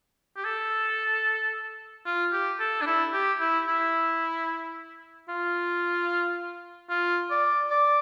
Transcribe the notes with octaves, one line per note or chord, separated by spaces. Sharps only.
G4
A4
F4
G4
A4
D4
E4
G4
E4
E4
F4
F4
D5
D5